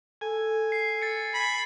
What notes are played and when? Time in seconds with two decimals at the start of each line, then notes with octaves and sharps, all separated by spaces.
0.21 A4 G#5
0.72 C7
1.02 A6 C#7
1.34 B5